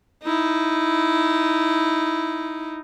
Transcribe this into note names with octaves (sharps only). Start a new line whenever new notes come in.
D#4 E4